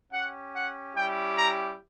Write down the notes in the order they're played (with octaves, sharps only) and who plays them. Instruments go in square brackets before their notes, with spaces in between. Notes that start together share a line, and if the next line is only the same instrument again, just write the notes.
[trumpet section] C#4 G4 F#5
F#5
G3 C#4 E4 G4 G5
A#5